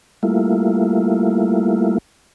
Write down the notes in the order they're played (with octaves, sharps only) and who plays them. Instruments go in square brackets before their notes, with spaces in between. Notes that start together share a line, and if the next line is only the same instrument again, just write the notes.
[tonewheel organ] G3 A3 A#3 E4 F4